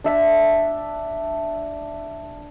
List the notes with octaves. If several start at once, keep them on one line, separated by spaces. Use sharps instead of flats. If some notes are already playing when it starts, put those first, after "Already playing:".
D4 E5